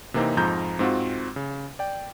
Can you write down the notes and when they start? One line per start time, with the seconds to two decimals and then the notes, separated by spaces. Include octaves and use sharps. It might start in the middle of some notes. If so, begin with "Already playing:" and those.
0.14 C3 E3 A#3 C4 D#4
0.37 F2 G#2 F3 A#5 G6
0.79 G#2 C4 F4 F#4
1.36 C#3
1.79 D5 G5